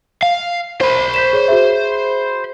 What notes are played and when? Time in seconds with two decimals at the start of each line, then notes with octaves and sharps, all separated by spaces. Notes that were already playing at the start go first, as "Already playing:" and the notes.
0.22 F5
0.81 C5 B5
1.14 G6 B6 E7
1.33 G#4 C#5
1.48 F#4 G#4 E5